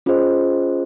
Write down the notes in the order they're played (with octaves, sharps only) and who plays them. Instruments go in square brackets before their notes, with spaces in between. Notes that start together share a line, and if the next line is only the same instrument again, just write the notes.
[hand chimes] C#4 F4 G#4 C5 D#5